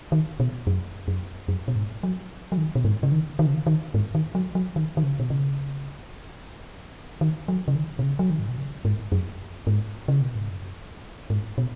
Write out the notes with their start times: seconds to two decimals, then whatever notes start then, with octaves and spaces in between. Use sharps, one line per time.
0.12 D#3
0.40 B2
0.67 F#2
1.08 F#2
1.48 F#2
1.68 B2
1.76 G#2
2.03 F#3
2.52 F#3
2.58 D#3
2.75 B2
2.85 G#2
3.03 C#3
3.12 D#3
3.39 D#3
3.47 C#3
3.54 D#3
3.67 D#3
3.94 G#2
4.15 D#3
4.35 F#3
4.55 F#3
4.76 D#3
4.97 D#3
5.03 C#3
5.20 B2
5.30 C#3
7.21 D#3
7.48 F#3
7.68 C#3
7.76 D#3
7.99 B2
8.03 C#3
8.19 F#3
8.30 D#3
8.40 G#2
8.49 B2
8.57 C#3
8.85 G#2
9.12 F#2
9.67 G#2
10.08 C#3
10.21 B2
10.35 G#2
10.49 F#2
11.30 G#2
11.58 B2